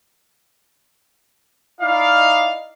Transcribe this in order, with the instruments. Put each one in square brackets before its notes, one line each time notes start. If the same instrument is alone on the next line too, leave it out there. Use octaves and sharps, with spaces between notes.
[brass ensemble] D#4 E4 D5 F5